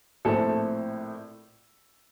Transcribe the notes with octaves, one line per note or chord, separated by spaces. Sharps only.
A#1 A2 A3 C4 A4